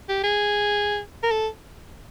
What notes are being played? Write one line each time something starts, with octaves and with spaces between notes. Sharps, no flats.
G4
G#4
A#4
A4